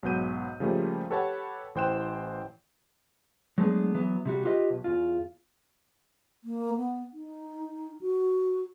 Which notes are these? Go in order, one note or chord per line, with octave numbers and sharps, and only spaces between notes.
B1 G#2 F#3 B3 G6 D#7
C#3 F3 G3 A3 A#3
G4 A4 B4 C#5 F#5 A5
A1 E3 C5 G5 F#6 E7
F#3 G#3 A3 B3 D4
E3 F#3 B3
C3 G3 F#4
F4 G4 B4 D#5
B1
E2 F4
A#3
B3
D#4
F#4